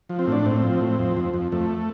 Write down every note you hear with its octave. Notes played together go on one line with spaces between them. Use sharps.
F3
C4
A2 D4
A2 C4
F3
A2
F2
F2
F2
F2 A3